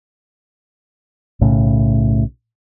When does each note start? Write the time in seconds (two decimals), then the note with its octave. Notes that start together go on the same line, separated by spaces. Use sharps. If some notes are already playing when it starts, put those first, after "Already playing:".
1.41 B1 A2 C#3